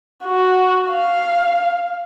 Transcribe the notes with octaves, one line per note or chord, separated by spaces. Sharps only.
F#4
F5